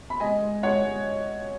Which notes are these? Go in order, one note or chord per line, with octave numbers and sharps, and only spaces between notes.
B5
G#3 D#5 G#5
G#3
G#3 C#5 F#5
G#3